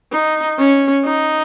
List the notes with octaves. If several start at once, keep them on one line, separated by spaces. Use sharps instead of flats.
D#4
C#4
D#4